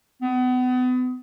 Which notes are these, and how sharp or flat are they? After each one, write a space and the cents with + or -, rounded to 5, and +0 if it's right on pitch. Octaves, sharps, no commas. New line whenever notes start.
B3 +35